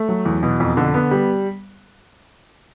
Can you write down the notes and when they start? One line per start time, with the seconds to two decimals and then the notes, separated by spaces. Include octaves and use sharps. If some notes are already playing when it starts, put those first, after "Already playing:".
Already playing: A3
0.09 F#3
0.25 E2
0.43 B2
0.60 F2
0.77 D3
0.94 B3
1.11 G3